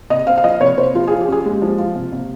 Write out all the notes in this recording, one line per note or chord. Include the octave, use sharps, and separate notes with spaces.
C3 D#5
C4 F5
F5
F3 D#5
C3 C#5
C3 C5
F3 F4
G#4
F4
G4
C#4 G#4
G#3 G4
F3
F4
C3
C3